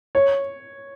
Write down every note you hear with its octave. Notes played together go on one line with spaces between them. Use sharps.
C#5